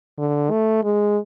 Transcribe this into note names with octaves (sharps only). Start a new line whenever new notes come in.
D3
A3
G#3